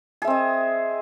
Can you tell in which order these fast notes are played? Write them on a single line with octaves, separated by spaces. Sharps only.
G#4 E5 C4 D#5